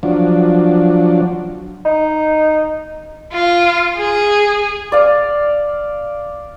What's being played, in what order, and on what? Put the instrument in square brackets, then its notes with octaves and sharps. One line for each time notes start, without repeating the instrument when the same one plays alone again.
[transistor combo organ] F3 F#3 D4
[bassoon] D#4
[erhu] F4
G#4
[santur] D5 F5